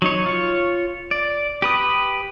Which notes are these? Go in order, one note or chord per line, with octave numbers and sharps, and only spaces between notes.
F#3 D#4 C#5
F4 C#5
D5
G4 B4 D#6